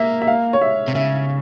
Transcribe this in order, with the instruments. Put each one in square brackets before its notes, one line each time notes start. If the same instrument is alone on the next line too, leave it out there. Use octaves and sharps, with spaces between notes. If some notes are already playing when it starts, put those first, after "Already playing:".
Already playing: [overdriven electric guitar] A#3 [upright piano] E5
[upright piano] E5
F5
C#5
E5
[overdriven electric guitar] C3
[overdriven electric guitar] C#3 [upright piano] E5